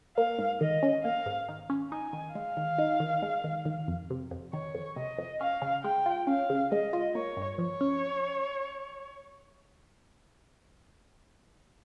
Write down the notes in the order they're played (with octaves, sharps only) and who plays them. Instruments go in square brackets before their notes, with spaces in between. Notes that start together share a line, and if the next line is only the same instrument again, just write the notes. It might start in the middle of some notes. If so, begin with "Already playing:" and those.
[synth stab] A#3 [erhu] F5
[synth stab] G#2
[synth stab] D#3 [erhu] D#5
[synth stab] C#4
[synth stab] A#3 [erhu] F5
[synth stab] G#2
D#3
C#4
[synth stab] D#4 [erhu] G#5
[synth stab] D#3
[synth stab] G#3 [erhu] F5
[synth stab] D#3
D#4
D#3
G#3
D#3
D#3
F2
C3
F2
[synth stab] D#3 [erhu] C#5
[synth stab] F2
[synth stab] C3 [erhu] D#5
[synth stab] F2
[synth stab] C#4 [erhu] F5
[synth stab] C#3
[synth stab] G#3 [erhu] G5
[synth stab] F4
[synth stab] C#4 [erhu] F5
[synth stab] C#3
[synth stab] G#3 [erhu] D#5
[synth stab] F4
[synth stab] A#3 [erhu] C#5
[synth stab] G2
[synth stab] F3 [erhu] C#5
[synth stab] C#4